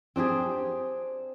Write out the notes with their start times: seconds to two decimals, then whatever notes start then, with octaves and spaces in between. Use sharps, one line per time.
0.16 C4 D4 G4 G#4